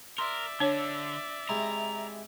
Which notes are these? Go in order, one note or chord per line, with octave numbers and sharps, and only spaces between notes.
A#4 D5 E5 C6
D3 D4 C#5
C3 G#3 E4 A#5